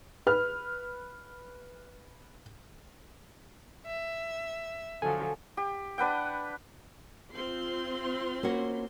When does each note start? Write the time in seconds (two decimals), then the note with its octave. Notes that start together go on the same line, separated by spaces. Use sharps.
0.27 B4 F6
3.86 E5
5.02 D3 F3 F#3 A4 G#5
5.57 G4
5.98 D4 B4 F#5 G5
7.33 C4 F4 C6
8.43 A#3 C#4 F#4